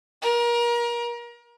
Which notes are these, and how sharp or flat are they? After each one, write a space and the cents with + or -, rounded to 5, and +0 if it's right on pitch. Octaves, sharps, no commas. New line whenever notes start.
A#4 +30